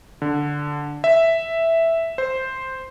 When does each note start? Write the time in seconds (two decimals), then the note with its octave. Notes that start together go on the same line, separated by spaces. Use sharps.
0.22 D3
1.04 E5
2.18 C5